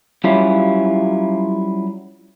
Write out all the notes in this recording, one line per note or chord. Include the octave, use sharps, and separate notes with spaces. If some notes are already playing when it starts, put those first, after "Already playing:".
F#3 G3 C#4 E4 F4